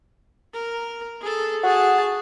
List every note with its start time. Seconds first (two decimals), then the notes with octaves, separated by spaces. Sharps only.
0.53 A#4
1.21 G#4 A4
1.63 F#4 G#4 A5